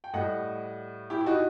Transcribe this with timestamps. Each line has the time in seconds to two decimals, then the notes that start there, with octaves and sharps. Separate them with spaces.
0.04 G5
0.13 A2 G3 D#5 F#5
1.10 E4 G4
1.20 E4
1.26 D#4 F#4